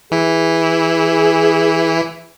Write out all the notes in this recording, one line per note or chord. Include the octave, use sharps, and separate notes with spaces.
E3 E4 G#4